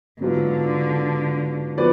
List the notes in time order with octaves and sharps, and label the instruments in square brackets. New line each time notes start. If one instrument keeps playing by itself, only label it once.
[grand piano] G#2 F#3 B3 F4 [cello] D3
[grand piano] F3 B3 F#4 B4 D5